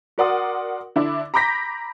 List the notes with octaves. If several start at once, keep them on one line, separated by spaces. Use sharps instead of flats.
F#4 A#4 D5 F#5 C6 D#6
D3 D4 E4
A#5 B5 D6 G6 A#6 B6